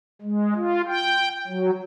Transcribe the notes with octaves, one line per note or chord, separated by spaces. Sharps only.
G#3
F4
G5
F#3